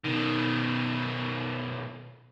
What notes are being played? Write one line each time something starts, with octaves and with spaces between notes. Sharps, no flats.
B2 D#3